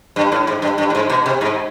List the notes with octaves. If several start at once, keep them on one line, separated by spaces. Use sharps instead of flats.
G2
A2
G#2
G2
G2
A2
G#2
B2
C3
G#2